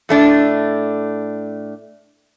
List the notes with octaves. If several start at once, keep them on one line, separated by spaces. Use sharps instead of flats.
A2 A3 D4